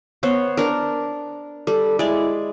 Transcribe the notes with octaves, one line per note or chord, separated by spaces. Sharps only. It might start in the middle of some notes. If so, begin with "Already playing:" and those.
B3 C5 C#5
D4 A#4
G3 A4
G#3 E4 D5